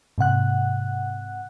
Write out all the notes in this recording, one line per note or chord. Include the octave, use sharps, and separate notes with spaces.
G#2 C3 F#5 F#6